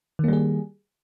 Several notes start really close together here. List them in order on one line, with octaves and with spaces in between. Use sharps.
D#3 A#3 G3 G#4